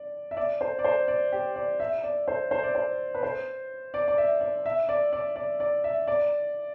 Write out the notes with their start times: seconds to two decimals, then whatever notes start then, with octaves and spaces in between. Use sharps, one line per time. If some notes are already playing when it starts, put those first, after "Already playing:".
Already playing: D5
0.31 E5
0.37 D5
0.61 C5
0.79 D5
0.84 C5
1.08 D5
1.32 G4
1.56 D5
1.80 E5
2.04 D5
2.28 C5
2.51 C5
2.63 D5
2.75 C5
3.15 B4
3.23 C5
3.94 D5
4.08 D5
4.18 E5
4.41 D5
4.66 E5
4.89 D5
5.13 D5
5.36 D5
5.60 D5
5.84 E5
6.07 D5